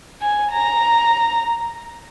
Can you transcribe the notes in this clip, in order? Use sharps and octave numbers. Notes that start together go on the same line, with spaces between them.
G#5
A#5